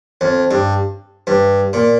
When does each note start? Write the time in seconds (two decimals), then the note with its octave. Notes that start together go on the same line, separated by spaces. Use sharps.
0.21 F2
0.51 G2
1.27 G2
1.73 A#2